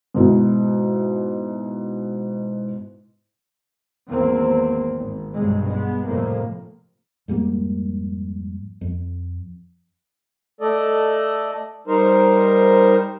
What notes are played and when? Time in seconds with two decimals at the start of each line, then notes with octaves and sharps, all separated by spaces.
0.14 G#2 B2 E4
4.09 G#1 E2 A#3 C4
4.98 G#1
5.34 B1 G2 C3 G#3
5.68 G#3 B3
6.07 F1 F2 A2 A#3
7.28 F2 G#2 G3 A#3
8.81 F2
10.61 A3 A4 D5 D#5
11.87 G3 D#4 A#4 C5